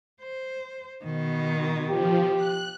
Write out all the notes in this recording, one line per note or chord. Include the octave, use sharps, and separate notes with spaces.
C5
B2 D#3
F3 G4
F#6